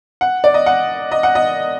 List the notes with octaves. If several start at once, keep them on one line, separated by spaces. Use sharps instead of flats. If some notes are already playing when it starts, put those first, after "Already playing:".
F#5
D5
D#5
F#5
D#5
F#5
D#5